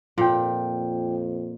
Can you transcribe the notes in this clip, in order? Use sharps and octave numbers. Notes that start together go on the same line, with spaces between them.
F2 A#2 F4 G5